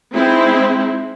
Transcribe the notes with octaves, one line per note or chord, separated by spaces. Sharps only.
G#3 C4 D#4 E4